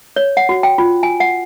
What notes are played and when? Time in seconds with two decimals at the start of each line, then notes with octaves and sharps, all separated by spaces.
0.16 C#5
0.37 F#5
0.49 F#4
0.63 G5
0.78 F4
1.03 G#5
1.20 F#5